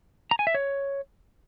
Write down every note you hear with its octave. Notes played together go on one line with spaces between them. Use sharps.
A#5
G#5
E5
C#5